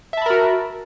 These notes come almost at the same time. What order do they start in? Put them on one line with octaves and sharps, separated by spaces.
E5 A5 B5 A#4 F#4